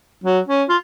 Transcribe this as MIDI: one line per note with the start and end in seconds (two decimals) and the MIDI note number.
0.24 0.39 54
0.48 0.63 61
0.69 0.77 65